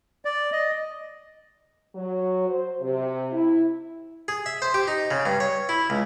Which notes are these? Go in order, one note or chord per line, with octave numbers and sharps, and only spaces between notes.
D5
D#5
F#3
C5
C3
E4
G#4
E5
C5
G4
D#4
C#3
G2
C#5
E4
C#2